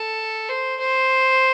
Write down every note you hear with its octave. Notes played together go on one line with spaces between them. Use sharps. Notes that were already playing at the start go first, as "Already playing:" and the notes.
Already playing: A4
C5
C5